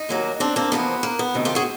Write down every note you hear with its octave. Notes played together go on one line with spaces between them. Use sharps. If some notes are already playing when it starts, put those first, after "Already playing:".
Already playing: D#4
D#2 D#3 F#3 A#3
C4 D4
A#3 C4
E2 C3 F3 A#3 B3
A#3
B3
D2 C3 D#3
F4 G4
F#4 G#4